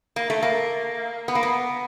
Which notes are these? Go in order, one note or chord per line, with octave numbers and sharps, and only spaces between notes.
A#3
A3
A#3
B3
A#3
B3